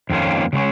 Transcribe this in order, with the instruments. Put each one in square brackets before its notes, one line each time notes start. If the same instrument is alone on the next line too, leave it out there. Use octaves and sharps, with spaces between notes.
[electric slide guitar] F2 D#3 A#3 C#4 F4
C#3 G#3 C#4